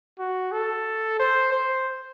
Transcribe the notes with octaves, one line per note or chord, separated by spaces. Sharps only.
F#4
A4
C5
C5